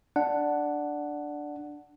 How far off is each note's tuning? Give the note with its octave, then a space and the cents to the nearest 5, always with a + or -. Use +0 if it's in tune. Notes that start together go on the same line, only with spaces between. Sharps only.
D4 +0 F#5 +0